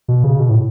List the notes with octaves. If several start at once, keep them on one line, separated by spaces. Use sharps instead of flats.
B2
C#3
B2
A2